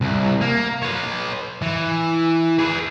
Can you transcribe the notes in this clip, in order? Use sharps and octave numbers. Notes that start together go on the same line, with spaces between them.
C2
A#3
B4 C#5
E3
G#4 B4